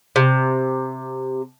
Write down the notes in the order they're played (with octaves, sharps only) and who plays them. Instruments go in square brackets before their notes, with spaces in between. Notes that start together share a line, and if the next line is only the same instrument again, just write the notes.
[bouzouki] C3